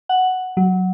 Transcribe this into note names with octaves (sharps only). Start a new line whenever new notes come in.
F#5
F#3